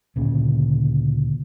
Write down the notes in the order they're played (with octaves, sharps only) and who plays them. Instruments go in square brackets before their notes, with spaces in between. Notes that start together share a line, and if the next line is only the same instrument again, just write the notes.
[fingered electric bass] D2 A#2 C#3